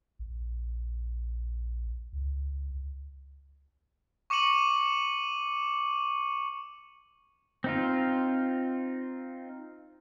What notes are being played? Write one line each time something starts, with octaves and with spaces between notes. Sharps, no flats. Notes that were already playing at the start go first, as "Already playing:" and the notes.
A#1
C#2
C#6 D6 C#7 D#7 F#7
C4 D#4 F4